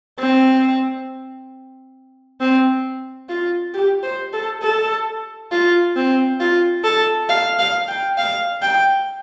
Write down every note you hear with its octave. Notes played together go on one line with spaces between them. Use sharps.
C4
C4
F4
G4
C5
A4
A4
F4
C4
F4
A4
F5
F5
G5
F5
G5